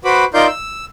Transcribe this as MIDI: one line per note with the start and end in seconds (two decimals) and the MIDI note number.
0.05 0.25 66
0.05 0.25 71
0.05 0.25 72
0.05 0.25 83
0.05 0.25 86
0.34 0.47 63
0.34 0.47 65
0.34 0.47 70
0.34 0.47 74
0.34 0.47 84
0.34 0.47 91
0.47 0.85 88